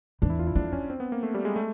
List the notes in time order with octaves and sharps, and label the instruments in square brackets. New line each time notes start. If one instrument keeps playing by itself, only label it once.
[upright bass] E2 [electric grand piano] D4
[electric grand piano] E4
F4
E4
[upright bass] F2 [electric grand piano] D4
[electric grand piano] C#4
C4
B3
A#3
A3
G3
G#3
A3